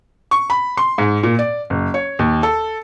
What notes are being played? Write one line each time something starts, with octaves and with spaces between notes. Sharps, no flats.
C#6
B5
C6
G#2
A#2
D5
F#1
C#5
D#2
A4